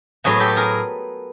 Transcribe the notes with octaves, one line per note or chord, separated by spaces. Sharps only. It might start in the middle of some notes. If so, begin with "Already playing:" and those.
A2 F#3 B3 F#4 G#4
G4 A4
G#4 A#4